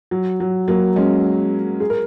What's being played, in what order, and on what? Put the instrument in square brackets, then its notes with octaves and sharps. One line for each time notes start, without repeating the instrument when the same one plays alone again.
[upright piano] F#3
F#3
F#3 A#3
G#3 C#4
G#4
A#4